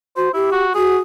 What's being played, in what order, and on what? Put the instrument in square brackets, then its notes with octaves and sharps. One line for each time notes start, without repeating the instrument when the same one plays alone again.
[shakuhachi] F#4 [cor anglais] C5
[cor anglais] E4 [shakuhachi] G4
[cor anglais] F#4
[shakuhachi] F#4 [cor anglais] G#4